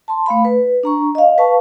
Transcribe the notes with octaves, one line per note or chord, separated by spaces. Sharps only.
A5 C6
A3 F5 B5
B4
D4 A#5 C#6
D#5 F5
B4 F5 A5 C#6